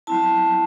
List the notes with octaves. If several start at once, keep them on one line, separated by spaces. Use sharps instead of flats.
F#3 C4 E4 A5